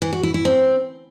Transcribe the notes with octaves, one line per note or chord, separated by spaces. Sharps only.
E3
F#4
E4
E4
C4